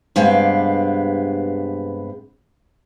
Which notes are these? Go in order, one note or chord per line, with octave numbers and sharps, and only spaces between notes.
G2 C3 G#3 B3 G4 F5